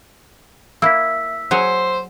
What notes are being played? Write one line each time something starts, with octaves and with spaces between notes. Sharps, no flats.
A#3 E4 E6 B6
F#3 G#4 C5 C#5